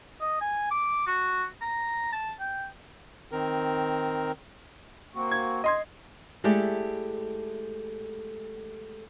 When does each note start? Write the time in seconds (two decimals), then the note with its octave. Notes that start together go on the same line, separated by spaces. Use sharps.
0.21 D#5
0.41 G#5
0.71 D6
1.06 F#4
1.62 A#5
2.12 A5
2.40 G5
3.31 D#3 C4 A#4
5.14 A#3 C4 F#4
5.31 G#6
5.64 D#5 C6 G#6
6.44 G#3 A3 E4 G4 A4 D5